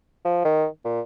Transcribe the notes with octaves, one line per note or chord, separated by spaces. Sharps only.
F3
D#3
A#2